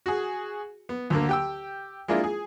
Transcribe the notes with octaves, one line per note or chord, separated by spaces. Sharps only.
F#4 G#4
B3
D2 D3 A#3
G4 G5 E6
G#3 A#3 D4 E4 F4
G#4